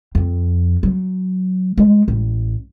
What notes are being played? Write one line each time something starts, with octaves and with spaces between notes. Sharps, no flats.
F2
F#3
G#3
A1